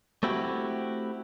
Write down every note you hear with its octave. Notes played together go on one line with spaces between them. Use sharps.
A3 C4 E4 F#4 G4